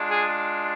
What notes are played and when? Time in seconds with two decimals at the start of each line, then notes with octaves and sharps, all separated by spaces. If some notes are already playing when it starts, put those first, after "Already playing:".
Already playing: G#3 D4 F4
0.09 G#4